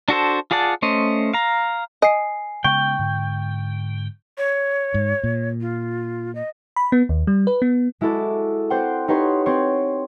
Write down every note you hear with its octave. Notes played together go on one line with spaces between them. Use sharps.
D4 F#4 A4 C5
F4 G#4 D5 F#5 A5
A3 C#4 C5 D#5
F5 A#5
D#5 G#5 C7
C#3 G#3 B3 G5 C#6
G#2 D3
C#5
G#2
A#2
F4
D#5
B5
B3
D#2
G3
B4
B3
G#3 E4 F#4 A4 D6
C4 C5 D5 F#5 G5
D#4 G4 B4 C#5 F#5 C6
C4 C#5 C6